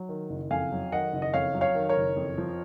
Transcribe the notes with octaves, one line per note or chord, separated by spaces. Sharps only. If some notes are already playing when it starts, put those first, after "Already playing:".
Already playing: F#3
D#3
F#1
F2 F5 G#5
F#3
D#3 D#5 F#5
F#1
D#5
F2 C#5 F5
F#3
C#5 F5
D#3
A#4 C#5
F#1
F2
F3